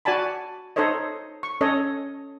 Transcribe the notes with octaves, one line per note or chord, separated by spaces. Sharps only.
F#4 D5 G#5 A5 B5
D#4 A4 C5 C#5 D#5
C#6
C#4 A4 C#5 D#5